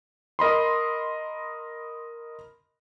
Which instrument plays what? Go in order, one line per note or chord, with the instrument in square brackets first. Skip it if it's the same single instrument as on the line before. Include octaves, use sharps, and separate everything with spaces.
[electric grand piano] A#4 D#5 B5 C6